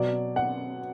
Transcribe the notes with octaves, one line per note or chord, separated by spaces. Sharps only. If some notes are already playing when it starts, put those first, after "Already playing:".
Already playing: B2 F#3 D5
F#5